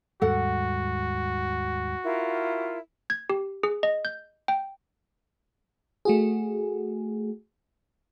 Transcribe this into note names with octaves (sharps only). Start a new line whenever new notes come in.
D#2 G#2 G3 F#4 A4 F#5
E4 F4 A#4
G#6
G4
G#4
D#5
G6
G5
A3 F#4 G#4